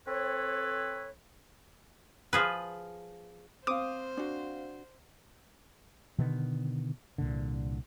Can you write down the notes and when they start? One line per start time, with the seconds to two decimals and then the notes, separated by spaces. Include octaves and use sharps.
0.07 C4 A4 B4 C#5
2.33 F3 G#4 B4
3.67 C4 C5 F5 D6 D#6 D#7
4.17 D4 F#4
6.19 B2 D3 D#3 B3
7.18 C2 A#2 D3